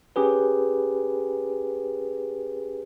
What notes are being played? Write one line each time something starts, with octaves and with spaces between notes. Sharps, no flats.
C#4 G4 G#4 B4